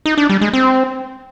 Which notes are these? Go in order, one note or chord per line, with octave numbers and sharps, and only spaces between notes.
D#4
D4
G3
G#3
C4